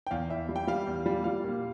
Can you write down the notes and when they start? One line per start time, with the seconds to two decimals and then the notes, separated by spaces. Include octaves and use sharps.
0.07 G5
0.11 E2 F5
0.29 E2 E5
0.49 G3
0.56 G5
0.67 G3 F5
0.87 E2
1.06 G3
1.24 G3 F5
1.44 A#2